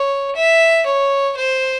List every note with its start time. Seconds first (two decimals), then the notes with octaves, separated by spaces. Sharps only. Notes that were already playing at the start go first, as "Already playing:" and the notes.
Already playing: C#5
0.36 E5
0.86 C#5
1.36 C5